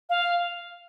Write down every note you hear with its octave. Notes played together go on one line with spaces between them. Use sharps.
F5